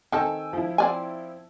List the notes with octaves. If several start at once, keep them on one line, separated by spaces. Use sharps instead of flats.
D#3 C4 A4 G5 G#5 E6
F3 E4
C4 D5 G#5